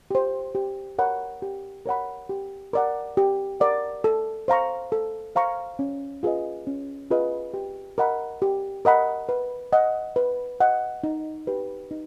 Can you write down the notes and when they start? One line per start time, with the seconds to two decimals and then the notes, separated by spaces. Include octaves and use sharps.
0.11 G4 C5
0.55 G4
0.99 A#4 C#5 F#5 B5
1.42 G4
1.86 A#4 C#5 F#5 B5
2.29 G4
2.73 A#4 D5 F#5
3.17 G4
3.60 A#4 D5 F#5
4.04 A4
4.48 C5 F5 A#5 C#6
4.92 A4
5.35 C5 F5 A#5 C#6
5.79 C#4
6.23 F4 G#4 B4 D#5
6.67 C#4
7.11 F4 G#4 B4 D#5
7.54 G4
7.98 A#4 D#5 F#5 B5
8.42 G4
8.85 A#4 D#5 F#5 B5
9.29 B4
9.73 D#5 F#5
10.16 B4
10.60 D#5 F#5
11.04 D#4
11.47 G4 B4
11.91 D#4